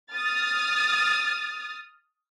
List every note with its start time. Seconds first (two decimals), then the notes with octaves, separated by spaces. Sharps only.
0.14 D#6 F6 A6